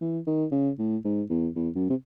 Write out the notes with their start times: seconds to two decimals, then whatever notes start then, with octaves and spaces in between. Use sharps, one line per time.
0.01 E3
0.27 D#3
0.52 C#3
0.79 A2
1.04 G#2
1.30 E2
1.56 E2
1.75 F#2
1.90 C3